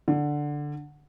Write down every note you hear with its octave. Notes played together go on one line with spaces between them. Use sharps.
D3